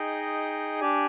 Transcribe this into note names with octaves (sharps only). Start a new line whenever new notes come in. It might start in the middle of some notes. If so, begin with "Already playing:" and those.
Already playing: D#4 G#4 D#5 G5
D4 G4 D5 G#5